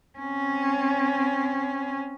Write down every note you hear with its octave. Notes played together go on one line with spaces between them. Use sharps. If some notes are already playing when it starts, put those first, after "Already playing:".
C4 C#4